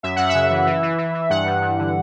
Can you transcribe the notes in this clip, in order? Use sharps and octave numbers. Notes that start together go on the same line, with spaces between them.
F#2 E5
F#2 F#5
C#3 E5
E3
E3
E3
E3
E3
G2 F#5
G2
G2
D3